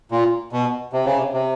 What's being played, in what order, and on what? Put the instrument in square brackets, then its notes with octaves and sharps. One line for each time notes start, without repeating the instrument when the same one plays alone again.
[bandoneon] A#2
B2
C3
C#3
C3
C3